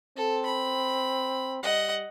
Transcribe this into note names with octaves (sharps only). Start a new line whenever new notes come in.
C4 A4
B5
G3 D#5 F#5